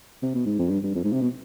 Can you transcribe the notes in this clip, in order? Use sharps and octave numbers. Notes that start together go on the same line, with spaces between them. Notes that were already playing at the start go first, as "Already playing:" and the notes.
C3
B2
G#2
F2
G2
G2
F2
G#2
C3
B2